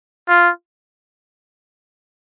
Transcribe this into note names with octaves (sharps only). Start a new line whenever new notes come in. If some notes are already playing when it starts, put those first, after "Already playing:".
F4